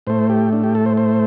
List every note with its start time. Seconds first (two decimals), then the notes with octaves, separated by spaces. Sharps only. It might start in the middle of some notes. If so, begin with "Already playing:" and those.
0.07 A2 A3 C5
0.30 G4
0.53 D4
0.64 G4
0.75 A4
0.86 C5
0.97 C5